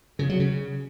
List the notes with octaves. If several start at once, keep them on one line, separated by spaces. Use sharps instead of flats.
C#3
F#3
C#3